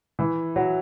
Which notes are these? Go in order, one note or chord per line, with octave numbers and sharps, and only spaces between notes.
E3
F#3